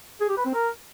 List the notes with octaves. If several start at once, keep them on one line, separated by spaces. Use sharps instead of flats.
G#4
G4
B4
C4
A#4